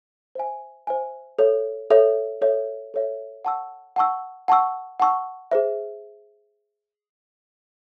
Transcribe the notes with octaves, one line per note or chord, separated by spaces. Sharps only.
C5 E5 G#5
C5 E5 G#5
A4 C#5 E5
A4 C#5 E5
A4 C#5 E5
A4 C#5 E5
F#5 A5 C#6 E6
F#5 A5 C#6 E6
F#5 A5 C#6 E6
F#5 A5 C#6 E6
G#4 C5 E5